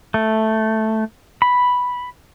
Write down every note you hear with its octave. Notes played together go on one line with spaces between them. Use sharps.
A3
B5